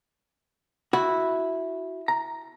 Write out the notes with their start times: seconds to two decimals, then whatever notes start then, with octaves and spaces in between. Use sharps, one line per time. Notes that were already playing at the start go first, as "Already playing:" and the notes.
0.93 E4 F#4
2.08 A#5